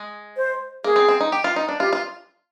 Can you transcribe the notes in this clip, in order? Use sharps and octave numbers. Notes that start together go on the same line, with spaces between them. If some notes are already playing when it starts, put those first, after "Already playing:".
Already playing: G#3
C5
A#3 G#4
C4
C4
D#4
G4
F4
D#4
D4
F4 G4
F4